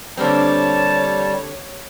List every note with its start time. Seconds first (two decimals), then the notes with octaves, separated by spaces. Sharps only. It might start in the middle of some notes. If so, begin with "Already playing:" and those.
0.17 D3 G3 A#3 C4 G4 C#5 A5